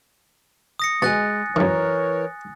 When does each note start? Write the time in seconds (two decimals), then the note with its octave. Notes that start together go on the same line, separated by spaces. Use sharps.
0.79 D#6 A#6 C#7
1.02 B2 G#3 G#5 F#6 A6
1.56 F#2 D#3 E3 A#4 C#5